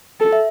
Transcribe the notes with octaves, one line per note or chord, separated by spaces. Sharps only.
A4
E5